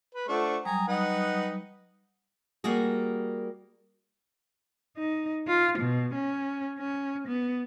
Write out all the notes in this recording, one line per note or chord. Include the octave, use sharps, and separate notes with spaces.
B4
A3 D4 F4 C5 F#5 C#6
F#3 G3 G#5 A#5 D#6
D#4 B4 F#5
G3 A#3 F#4 G#4
D#4
F4
B2
C#4
C#4
B3